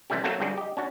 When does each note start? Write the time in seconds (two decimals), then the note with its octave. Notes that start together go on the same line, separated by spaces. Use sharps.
0.10 C3 E3 G3 A3 C#4 G4
0.24 F#3 A3 A#3 C4 F#4 A4
0.40 G1 G2 C4 F#4 G#4 D5
0.58 G4 D#5
0.77 C#4 D4 F#4